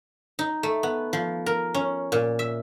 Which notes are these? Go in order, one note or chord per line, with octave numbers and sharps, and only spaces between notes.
D#4
A3
B3
F3
A#4
C#4
A#2
E5